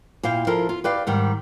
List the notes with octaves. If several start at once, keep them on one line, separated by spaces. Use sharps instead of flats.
A#2 E4 F5 G5
F3 E4 F4 A4 A#4
F4
G4 B4 D5 F5
G#2 D#3 G3